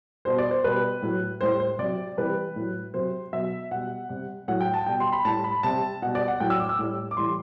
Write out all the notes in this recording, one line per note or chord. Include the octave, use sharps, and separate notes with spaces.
B2 G3 C5
D5
C5
B2 G3 B4
A2 F#3
A2 G3 C5
C5
C3 F#3 D5
C3 E3 G3 B4
A2 F#3
C3 F#3 C5
B2 F#3 E5
B2 G3 F#5
C3 G3
A2 F#3 F#5
G5
A5
B2 G3 G5
C6
B5
A2 G3 A5
B5
C3 G3 A5
B2 G3 F#5
D5
F#5
A2 F#3 G5
E6
D6
E6
A2 G3
D6
A2 E3 G3 C6